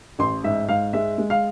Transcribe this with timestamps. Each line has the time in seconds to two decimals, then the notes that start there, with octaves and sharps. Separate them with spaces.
0.19 A1 C6
0.44 G#2 E5
0.69 G#2 F5
0.93 G#3 E5
1.18 G#3
1.30 F5